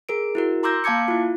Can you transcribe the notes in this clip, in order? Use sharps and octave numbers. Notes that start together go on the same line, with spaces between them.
G#4 A#4 D7
E4 F#4 A#4
A#5 C6 D6 E6 G6 A#6
A#3 F5 A5 D6 G#6 C#7
E4 F4